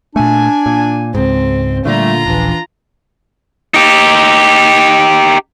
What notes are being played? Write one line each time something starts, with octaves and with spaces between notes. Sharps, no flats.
A#2 A3 D4 G#5
A#2
C#2 G#2 C4
A#2 D3 G3 A3 F4 A#5
D#1 A#1 E3 D4
D#4 G4